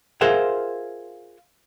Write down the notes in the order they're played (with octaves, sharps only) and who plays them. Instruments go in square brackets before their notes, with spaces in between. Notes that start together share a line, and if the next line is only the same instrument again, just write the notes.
[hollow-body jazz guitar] F4 G#4 A#4 C5 E5 F#5